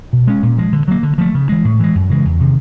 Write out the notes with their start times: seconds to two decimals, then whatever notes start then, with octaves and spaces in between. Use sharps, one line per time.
0.13 B2
0.27 G#3 C#4
0.43 A#2
0.58 F3 G#3
0.73 D3
0.88 F#3 A#3
1.03 D3
1.18 F3 A3
1.34 C#3
1.49 E3 G#3
1.65 A2
1.79 E3 G#3
1.95 F#2
2.09 C#3 E3 G#3
2.25 E2
2.40 C3 D#3